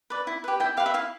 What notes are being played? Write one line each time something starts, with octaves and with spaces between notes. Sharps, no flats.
B4 D5
E4
G4 B4
E4 G5
G4 B4 F5
E5
E4 F5